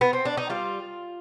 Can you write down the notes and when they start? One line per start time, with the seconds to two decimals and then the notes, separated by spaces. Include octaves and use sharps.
0.01 B3
0.13 C4
0.25 D4
0.37 D#4
0.50 G3 F4